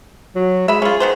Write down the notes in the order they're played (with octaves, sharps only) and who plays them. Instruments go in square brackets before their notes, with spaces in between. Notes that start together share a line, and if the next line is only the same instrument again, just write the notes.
[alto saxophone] F#3
[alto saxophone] G#3 [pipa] E5 B5
[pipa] C#4 F4 [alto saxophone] G#4
[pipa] D#3 B3 C5